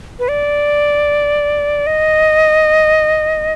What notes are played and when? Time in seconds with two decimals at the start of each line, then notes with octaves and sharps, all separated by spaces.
0.19 B4
0.28 D5
1.87 D#5